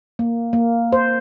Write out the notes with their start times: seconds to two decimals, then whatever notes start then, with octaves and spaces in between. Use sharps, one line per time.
0.19 A#3
0.53 A#3
0.93 C5